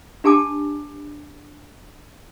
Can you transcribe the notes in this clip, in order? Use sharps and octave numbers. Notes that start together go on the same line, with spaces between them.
D4 G4 G#5 A5 D6